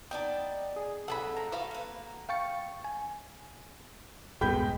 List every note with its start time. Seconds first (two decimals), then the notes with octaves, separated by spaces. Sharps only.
0.11 B3 D#4 D5 G5 A5
0.76 G#4
1.08 C3 F#3 D#4 A4 F#5 A5 B5
1.37 F3 A#5
1.52 F#4 A4 B4 E5 F5
1.71 A#3 B4
2.29 F5 G5 C#6 A6 C#7
2.84 G#5
4.41 D#1 G2 G#3 B3 G5 B5 G6